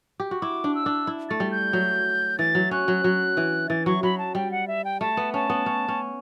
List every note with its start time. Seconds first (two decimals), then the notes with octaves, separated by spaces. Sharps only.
0.20 G4
0.31 F#4
0.42 E4 D6
0.64 D4
0.75 E6
0.86 D4
1.07 E4
1.29 A3 A6
1.40 G3
1.51 G6
1.73 F#3
2.39 E3 A6
2.55 F#3
2.71 C#4 F#6
2.88 F#3
3.04 F#3
3.37 E3
3.69 E3 A6
3.86 F#3 C#6
4.03 F#3 B5
4.18 A5
4.35 G3 G5
4.51 F#5
4.68 E5
4.85 G5
5.01 A3 A5
5.17 B3
5.34 C#4 A5
5.50 B3
5.66 C#4
5.88 C#4